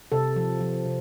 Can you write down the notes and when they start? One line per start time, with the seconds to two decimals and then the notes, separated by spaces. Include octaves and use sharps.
0.12 C3 A4
0.36 F3
0.61 F3
0.85 C3